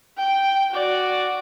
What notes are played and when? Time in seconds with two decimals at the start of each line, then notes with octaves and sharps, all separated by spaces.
0.18 G5
0.72 F#4 D5